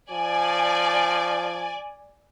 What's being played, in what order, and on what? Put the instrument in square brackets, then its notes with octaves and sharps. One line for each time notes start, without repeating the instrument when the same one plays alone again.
[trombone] F3 [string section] D5 G#5